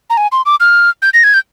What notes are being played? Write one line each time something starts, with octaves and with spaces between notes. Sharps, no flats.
A#5
G#5
C6
D6
F6
G6
A#6
G#6
G6